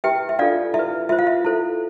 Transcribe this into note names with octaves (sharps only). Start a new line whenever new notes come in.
E4 G4 B4 E5 G5
E5
D4 F4 A4 D5 F5
E4 E5
B4
F4 C5 E5
F5
E5
E4 A4 C5